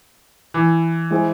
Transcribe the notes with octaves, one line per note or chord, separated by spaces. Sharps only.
E3
G#3 E4 G#4 C5